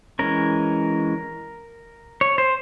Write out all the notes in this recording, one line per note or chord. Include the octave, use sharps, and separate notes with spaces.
E3 G#3 C#4 A#4
C#5
C5